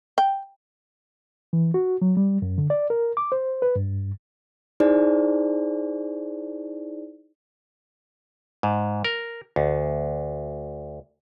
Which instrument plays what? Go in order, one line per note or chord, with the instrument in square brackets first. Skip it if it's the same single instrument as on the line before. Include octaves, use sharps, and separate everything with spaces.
[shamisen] G5
[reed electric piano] E3
F#4
F#3
G3
F#2
D3
D5
A#4
D6
C5
B4
G2
[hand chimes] D#4 E4 G#4 C5 D5
[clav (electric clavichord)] G#2
A#4
D2